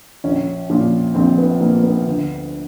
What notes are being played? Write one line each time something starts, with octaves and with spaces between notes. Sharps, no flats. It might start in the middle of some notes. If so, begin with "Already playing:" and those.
A#1 C#4
A#2 F3
A#1 C4
B3
A#2 F3 A#3
B3
D2